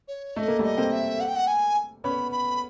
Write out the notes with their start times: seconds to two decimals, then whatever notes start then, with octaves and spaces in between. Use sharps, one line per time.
0.08 C#5
0.36 A3 D#5
0.48 A#3
0.59 G3 A3 D#5
0.78 A#3 C4
0.92 E5
1.20 F#5
1.28 G5
1.36 F#5
1.47 G#5
2.04 B3 C#4 B5
2.32 B5